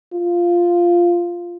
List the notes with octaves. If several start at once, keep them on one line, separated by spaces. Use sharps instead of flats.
F4